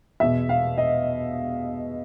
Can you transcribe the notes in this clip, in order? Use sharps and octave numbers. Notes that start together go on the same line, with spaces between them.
E2 B2 E5
F5
D#5